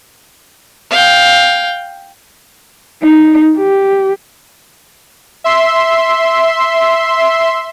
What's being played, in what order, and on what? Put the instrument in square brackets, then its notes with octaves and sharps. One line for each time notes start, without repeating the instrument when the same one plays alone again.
[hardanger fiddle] F5 G5
[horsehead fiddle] D#4
G4
[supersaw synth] E5 C6